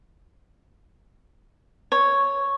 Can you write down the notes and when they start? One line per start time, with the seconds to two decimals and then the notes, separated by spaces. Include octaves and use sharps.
1.92 C#5